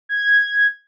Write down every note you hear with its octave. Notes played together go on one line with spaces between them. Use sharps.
G#6